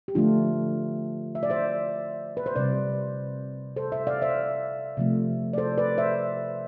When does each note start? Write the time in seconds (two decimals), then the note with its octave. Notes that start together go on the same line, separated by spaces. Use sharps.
0.08 G4
0.15 D3 F3 A3 D4 F4
1.35 E5
1.43 D5
1.50 C5 E5
2.37 B4
2.46 C5
2.56 C3 G3 B4 D5
3.76 A4 C5
3.92 C5 E5
4.07 D5 F5
4.22 C5 E5
4.97 C3 F3 A3
5.53 D5
5.58 A4 C5
5.78 B4 D5
5.98 C5 E5